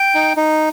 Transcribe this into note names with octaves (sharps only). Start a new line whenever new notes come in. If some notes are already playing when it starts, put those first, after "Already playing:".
Already playing: G5
D#4
D#4